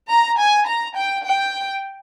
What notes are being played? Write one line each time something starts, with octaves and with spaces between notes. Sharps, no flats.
A#5
G#5
A#5
G5
G5